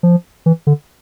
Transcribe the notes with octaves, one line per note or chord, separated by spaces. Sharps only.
F3
E3
D3